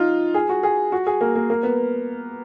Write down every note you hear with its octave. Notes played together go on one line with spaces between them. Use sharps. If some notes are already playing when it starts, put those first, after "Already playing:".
Already playing: D#4 F4
G#4
F#4
G#4
F#4
G#4
A#3
A#3
A#3
B3